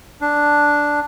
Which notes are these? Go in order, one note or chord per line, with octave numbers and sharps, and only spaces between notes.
D4